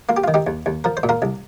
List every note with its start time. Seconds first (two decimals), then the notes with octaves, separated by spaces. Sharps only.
0.09 A#3 F4
0.17 G4
0.24 F4
0.28 D#3
0.34 D#4 G4
0.47 D#2
0.66 D#2
0.84 F3 A#4
0.97 C5
1.03 A#2
1.09 F4 A#4
1.22 C2